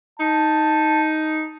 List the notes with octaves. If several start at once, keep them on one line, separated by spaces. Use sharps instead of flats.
D#4 A5